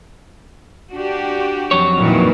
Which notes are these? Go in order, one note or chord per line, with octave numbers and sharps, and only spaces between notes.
D4 F#4 G4
F2 F#3 C#5
A#2 D#3 E3